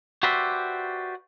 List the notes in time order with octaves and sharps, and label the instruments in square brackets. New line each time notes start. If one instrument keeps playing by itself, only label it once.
[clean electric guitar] F#4 G4 B4 C5 D5 E5